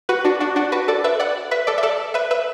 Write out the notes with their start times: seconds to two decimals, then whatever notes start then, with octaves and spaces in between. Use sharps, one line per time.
0.09 F#4 B4
0.25 D4 F#4
0.40 D4 F#4
0.56 D4 F#4
0.72 F#4 B4
0.88 A4 D5
1.04 B4 E5
1.20 D5 F#5
1.51 B4 E5
1.67 A4 D5
1.78 E5
1.83 A4 D5
2.14 B4 E5
2.31 B4 E5